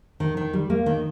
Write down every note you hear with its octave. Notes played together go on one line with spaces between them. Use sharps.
D#3
D#3
G3
A#3
D#3